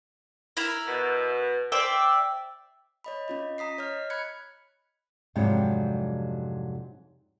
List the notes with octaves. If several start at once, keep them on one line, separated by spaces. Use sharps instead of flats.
E4 A#4
B2
C5 D5 E5 G5
C#5 D#5 B5
C#4 F4 D#5
A#5 D#6 B6 C7
C#5 D#5 F6
B5 F#6 G#6 C#7
F2 G#2 C3 F#3 G3 D4